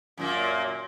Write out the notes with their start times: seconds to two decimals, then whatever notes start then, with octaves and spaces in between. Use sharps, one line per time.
0.17 F#2 A#2 A#3